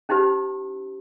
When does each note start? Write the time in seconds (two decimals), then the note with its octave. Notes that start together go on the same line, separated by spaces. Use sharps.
0.09 C#4 D#4 E4 G4 C5